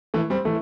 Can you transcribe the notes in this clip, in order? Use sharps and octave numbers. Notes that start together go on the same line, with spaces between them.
E3 A3
G3 C4
E3 A3